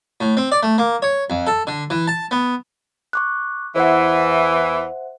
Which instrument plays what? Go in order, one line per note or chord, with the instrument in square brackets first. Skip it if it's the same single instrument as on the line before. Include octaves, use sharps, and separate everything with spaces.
[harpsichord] A2
C4
D5
A3
A#3
C#5
F2
A4
D3
E3
A5
B3
[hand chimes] C#6 D6 F#6
[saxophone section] E2 E3 [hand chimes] C5 E5 F#5